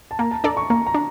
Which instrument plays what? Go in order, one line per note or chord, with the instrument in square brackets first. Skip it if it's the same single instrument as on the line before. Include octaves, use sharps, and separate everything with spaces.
[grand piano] A5
[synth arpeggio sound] A#3 [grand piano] A#5
[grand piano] A5
[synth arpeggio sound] D4 A4 D5 [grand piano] A#5
[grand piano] C#6
[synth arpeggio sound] A#3 [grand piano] A#5
[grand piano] A#5
[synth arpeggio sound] D4